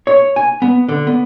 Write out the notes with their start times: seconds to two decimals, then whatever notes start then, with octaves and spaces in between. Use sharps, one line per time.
0.07 C#5
0.36 G#5
0.62 B3
0.89 D3
1.07 B3